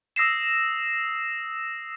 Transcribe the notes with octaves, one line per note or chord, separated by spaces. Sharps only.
D#6 E6 A#6 C7 E7